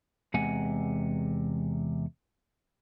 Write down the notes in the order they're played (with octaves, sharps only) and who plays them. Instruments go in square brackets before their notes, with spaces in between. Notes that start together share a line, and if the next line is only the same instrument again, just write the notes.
[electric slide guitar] E2 C3 G#3 F#5 G#5